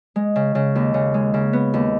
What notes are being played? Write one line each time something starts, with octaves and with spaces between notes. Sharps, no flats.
G#3
C#3
C#3
D#2
C#3
G#3
C#3
B3
D#2